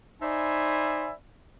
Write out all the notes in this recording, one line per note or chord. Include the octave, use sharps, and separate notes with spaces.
D#4 C5 D5 E5 G#5 B5